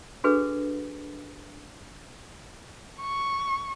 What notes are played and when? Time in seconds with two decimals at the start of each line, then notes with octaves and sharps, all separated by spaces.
0.24 D4 F#4 G#4 A4 B4
3.01 C#6